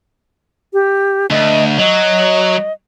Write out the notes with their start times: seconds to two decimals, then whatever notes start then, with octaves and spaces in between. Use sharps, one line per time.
0.73 G4
1.30 D2 D#5
1.78 F#3 D#5